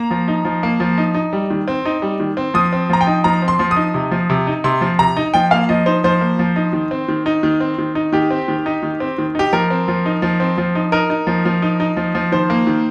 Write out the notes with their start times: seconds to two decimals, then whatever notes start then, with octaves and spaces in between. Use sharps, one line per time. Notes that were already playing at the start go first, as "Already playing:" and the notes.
Already playing: A#3 A#5
0.11 F3
0.28 D#4
0.45 F3
0.63 A#3
0.80 F3
0.98 D#4
1.14 D#4
1.33 G3
1.50 D#3
1.68 C4
1.85 D#4
2.02 G3
2.20 D#3
2.37 C4
2.54 F3 D#6
2.72 C4
2.90 F3 A#5
3.01 G5
3.07 D#4
3.24 F3 A#5
3.42 C4
3.48 C6
3.59 F3
3.71 D#6
3.76 D#4
3.94 C3
4.11 F3
4.30 C3
4.47 D#4
4.64 C3 C6
4.81 F3
4.99 C3 A#5
5.17 D#4
5.34 F3 G5
5.51 A#3 F5
5.69 F3 D#5
5.86 D#4 C5
6.04 F3 C5
6.21 A#3
6.39 F3
6.56 D#4
6.73 D#3
6.91 C4
7.08 D#3
7.26 D#4
7.43 D#3
7.60 C4
7.78 D#3
7.95 D#4
8.13 D#3 G4
8.30 C4
8.48 D#3
8.66 D#4
8.83 D#3
9.00 C4
9.18 D#3
9.35 D#4 G4
9.53 F3 A#4
9.70 C4
9.88 F3
10.06 D#4
10.22 F3
10.40 C4
10.58 F3
10.75 D#4
10.92 D#4 A#4
11.10 D#4
11.27 F3
11.45 F3
11.62 D#4
11.80 D#4
11.97 F3
12.15 F3
12.32 D#3 C5
12.50 A#3
12.67 D#3